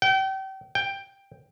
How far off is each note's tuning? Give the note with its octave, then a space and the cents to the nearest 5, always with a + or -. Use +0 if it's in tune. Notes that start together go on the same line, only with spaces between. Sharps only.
G5 -35
G5 +5